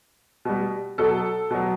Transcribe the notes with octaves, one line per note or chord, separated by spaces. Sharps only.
B2 G3
B2 F#3 A4
B2 F#3